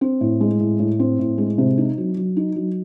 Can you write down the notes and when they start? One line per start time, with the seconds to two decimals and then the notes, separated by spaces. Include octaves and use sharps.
0.01 C4
0.21 A2
0.41 G#3
0.60 A2
0.79 A2
0.99 C4
1.19 A2
1.38 G#3
1.58 C3
1.78 D#4
1.98 F#3
2.16 F#3
2.36 D#4
2.56 F#3